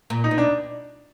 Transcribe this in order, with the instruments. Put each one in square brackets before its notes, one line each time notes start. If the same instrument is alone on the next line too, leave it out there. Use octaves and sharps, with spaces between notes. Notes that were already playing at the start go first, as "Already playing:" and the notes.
[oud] A#2
[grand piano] D#4
[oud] B2
[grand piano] D4